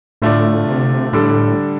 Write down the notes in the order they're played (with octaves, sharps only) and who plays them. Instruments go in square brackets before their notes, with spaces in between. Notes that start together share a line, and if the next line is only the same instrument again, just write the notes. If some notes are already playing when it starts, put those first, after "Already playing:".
[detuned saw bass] A2 [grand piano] D3 A3 F4 D5
[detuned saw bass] C3
[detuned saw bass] A2 [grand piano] D3 G3 D4 A4